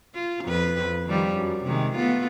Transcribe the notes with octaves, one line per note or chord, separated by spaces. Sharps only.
F4
F2 B4
D#3 F3 G3
F#2
C3 D#3 G#3
A3 B3 F4